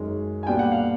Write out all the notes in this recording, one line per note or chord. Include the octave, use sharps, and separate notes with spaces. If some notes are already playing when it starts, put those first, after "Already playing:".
Already playing: F#2 D#3 G#3 C#4
G#5
A#2 G3 B3 D4 G5
F#5
F5